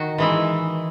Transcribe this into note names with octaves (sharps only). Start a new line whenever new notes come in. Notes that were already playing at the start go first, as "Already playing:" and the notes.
Already playing: D#3 F#4
E3 G#3 E4